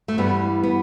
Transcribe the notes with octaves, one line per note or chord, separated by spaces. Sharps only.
A3
G2 E3 G3 B3
B3